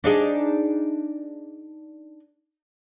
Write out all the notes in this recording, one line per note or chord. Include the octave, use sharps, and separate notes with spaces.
D4 D#4 G#4